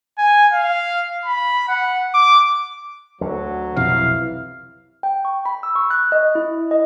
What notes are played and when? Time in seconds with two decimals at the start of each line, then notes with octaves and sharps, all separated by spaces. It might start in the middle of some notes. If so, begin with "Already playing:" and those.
0.18 G#5
0.53 F5
1.26 B5
1.68 F#5
2.14 D6
3.21 D2 D3 F#3
3.76 B1 F2 C3 E3 F5
5.03 G5
5.25 C#6
5.46 B5
5.63 E6
5.75 C#6
5.91 F#6
6.12 D#5
6.35 E4
6.71 D#5